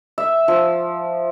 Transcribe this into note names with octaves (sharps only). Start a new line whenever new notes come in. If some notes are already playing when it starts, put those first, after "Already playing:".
E5
F3